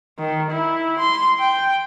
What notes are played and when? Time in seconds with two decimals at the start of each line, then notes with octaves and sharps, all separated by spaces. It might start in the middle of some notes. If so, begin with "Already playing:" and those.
0.19 D#3
0.51 E4
0.99 C6
1.40 G5